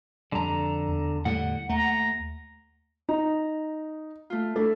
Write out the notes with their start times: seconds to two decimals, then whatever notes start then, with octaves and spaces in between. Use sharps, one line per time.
0.32 F2 D3 G3 A#5
0.88 E2
1.25 A2 D3 G3 F#5
1.69 D#2 A3 A#5
3.09 D#4 A#5
4.30 A3 F4
4.56 A3 D4 E4 A4